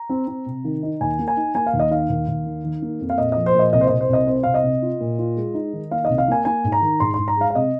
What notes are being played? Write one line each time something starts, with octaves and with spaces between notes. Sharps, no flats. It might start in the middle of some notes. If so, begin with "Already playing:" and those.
Already playing: A#5
C4
C4
C3
D#3
D#4
D#2 G#5
A#3
G#5
D#4
A#3 G#5
F5
D#2
D#5
D#3 F5
D#2
D#2
D#3
D#3
A#3
F2
F5
A#2 D#5
F3 D#5
C5
A#2 D#5
C2 D#5
C5
C2 D#5
C5
C2 D#5
C3 C5
C2 F5
D#5
C3
F4
A#2
F4
G#3
D#4
D#3
A#3 F5
C2 D#5
F5
A#3 G#5
A#3 G#5
G#2
A#5
D#3
G#2 C6
G#2 C6
A#5
G#3 F5
F5
C3 D#5